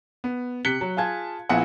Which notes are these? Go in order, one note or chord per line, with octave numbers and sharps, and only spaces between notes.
B3
C3 F#6 B6 C#7 G7
F#3
F4 G#4 A5 G#6
A#1 B3 E4 F4 G#4 F#5